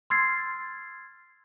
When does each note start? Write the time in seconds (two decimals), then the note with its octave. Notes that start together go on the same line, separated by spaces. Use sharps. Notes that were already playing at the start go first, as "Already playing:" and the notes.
0.10 C6 E6 F6 G#6 A6 C7